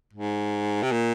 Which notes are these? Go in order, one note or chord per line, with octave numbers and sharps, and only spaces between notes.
G#2
C3
A#2